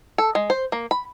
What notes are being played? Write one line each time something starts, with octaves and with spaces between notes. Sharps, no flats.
A4
G#3
C5
A#3
B5